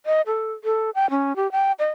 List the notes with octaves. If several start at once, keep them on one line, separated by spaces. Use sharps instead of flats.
D#5
A4
A4
G5
C#4
G4
G5
D#5